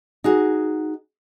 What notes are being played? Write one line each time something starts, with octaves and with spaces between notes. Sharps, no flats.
D#4 F#4 G#4